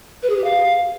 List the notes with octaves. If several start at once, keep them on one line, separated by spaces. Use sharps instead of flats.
B4
G#4
G4
F5